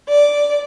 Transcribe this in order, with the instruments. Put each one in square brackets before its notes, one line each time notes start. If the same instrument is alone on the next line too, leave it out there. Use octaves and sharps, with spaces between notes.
[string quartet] D5